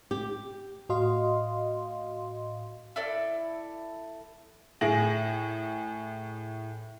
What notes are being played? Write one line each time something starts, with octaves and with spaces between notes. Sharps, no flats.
G4
A2 F#4 D#5 F5 C6
E4 A4 D5
A2 G#4 A#6 D7 F#7